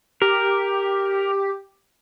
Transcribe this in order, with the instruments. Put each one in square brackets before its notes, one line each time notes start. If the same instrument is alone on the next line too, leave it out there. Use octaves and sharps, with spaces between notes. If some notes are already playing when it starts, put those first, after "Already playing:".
[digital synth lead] G4 [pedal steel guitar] A#4